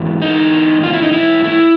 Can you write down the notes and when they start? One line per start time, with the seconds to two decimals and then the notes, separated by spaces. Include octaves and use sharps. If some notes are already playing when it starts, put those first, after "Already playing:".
Already playing: G#2 E3
0.22 D#4
0.83 F4
0.93 E4
1.03 D#4
1.13 E4
1.44 E4